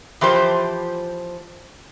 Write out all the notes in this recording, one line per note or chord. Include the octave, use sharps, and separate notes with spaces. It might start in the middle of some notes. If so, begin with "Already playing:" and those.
E3 F3 G4 C5